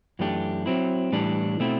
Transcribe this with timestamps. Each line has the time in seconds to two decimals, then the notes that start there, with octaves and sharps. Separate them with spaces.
0.19 F#2 E3 A3 D4 G4
0.66 F#3 C4 E4
1.12 A2 E3 G3 D4
1.60 B2 A3 C4 E4